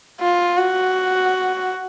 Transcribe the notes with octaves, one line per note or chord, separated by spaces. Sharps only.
F4
F#4